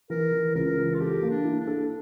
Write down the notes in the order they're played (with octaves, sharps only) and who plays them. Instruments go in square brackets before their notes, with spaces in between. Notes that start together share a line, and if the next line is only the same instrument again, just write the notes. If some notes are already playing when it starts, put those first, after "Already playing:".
[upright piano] E3 [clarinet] A#4
[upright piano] E3
[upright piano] C#2 [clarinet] A#4
[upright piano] E3
[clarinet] F4
[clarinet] G4 [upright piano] A4
[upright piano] A#3
[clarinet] D4
[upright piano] E4
[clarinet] D4
[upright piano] A4